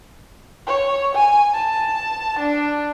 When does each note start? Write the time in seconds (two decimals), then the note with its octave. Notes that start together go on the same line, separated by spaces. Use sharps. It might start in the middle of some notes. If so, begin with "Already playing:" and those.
0.67 C#5
1.15 G#5
1.54 A5
2.39 D4